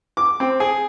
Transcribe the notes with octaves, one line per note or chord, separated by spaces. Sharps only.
D6
C4
G#4